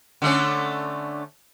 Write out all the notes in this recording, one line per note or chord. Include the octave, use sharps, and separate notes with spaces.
D3 A3 C#4